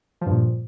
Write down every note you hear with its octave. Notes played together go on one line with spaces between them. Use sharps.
G2 A#2 F3